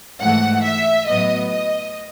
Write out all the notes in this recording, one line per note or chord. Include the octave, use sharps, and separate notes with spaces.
G#2 E3 A3 F#5
E5
A2 F#3 B3 D#5
D#5